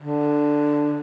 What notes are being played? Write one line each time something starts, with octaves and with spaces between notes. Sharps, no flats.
D3